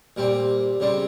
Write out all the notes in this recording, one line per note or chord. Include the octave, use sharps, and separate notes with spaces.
A#2 G3 C4
C#3 G3 C4